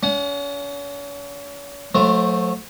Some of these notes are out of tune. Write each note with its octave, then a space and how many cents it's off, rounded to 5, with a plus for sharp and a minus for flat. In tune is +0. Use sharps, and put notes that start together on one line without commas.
C#4 +40 F#5 -20
F#3 -35 A3 +0 C5 +0